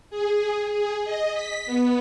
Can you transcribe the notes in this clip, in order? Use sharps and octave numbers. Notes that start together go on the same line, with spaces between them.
G#4
G#4
D#5
B6
B3